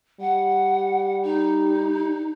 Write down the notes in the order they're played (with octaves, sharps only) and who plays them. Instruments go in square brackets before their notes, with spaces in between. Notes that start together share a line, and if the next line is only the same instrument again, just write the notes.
[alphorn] G3 [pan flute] F#5
[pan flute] D#4